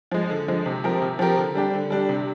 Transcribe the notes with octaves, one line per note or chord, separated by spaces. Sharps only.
F3 G#3
D3
F3 G#3
C3
F3 C4 G4 A#4
C3
F3 C4 G4 A#4
D3
G3 D4 G4
D3
G3 D4 G4
C3